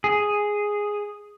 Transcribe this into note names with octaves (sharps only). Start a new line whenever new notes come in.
G#4